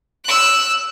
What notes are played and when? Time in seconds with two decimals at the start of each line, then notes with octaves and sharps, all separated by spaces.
0.24 E6 F#6